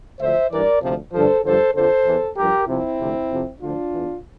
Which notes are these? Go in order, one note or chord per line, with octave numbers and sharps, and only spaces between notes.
D2 D3 F3 C5 E5
G2 E3 A#4 D5
D2 C3 F3
G2 D3 F3 A4 C5
G2 D3 F3 A4 C5
F2 D3 F3 A4 C5
E2 E3
G2 F3 G4 A#4
C2 C3 F3 C4 E4
D2 C3 F3
F2 C3 F3
D2 D3 F3 D4 F4
E2 E3